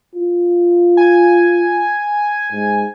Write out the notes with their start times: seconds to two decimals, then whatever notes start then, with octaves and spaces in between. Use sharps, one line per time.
0.15 F4
0.97 G#5
2.52 G#2